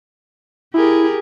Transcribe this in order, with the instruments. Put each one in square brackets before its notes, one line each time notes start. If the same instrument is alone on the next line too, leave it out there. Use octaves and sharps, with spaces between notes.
[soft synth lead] E4 [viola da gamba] G4 G#4 A#4